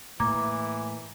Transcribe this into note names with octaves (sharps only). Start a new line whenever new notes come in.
A2 E3 A#3 A#5 D6 G#6